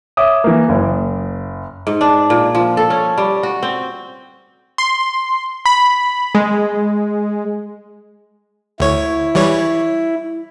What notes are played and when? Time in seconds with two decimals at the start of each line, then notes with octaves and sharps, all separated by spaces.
0.17 C#5 E5 D6 D#6
0.44 E3 A#3
0.69 F#1
1.87 G#2
2.01 D4
2.30 A#2
2.55 F3
2.77 A4
2.90 C#4
3.18 G3
3.43 F#4
3.63 C4
4.78 C6
5.66 B5
6.35 G#3
8.80 D2 E4 C#5
9.35 E3 G3 C#5